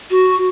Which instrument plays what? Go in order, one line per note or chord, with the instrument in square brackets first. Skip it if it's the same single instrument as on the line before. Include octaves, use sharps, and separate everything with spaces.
[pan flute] F#4